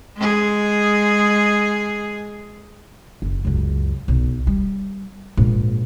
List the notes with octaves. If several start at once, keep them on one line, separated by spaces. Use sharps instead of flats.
G#3 G#4
F#1
C#2 F#2
B1
G3
A#1 G#2